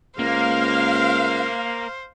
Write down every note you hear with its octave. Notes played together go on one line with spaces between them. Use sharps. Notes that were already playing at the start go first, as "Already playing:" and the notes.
C#2 A#3 C5 F5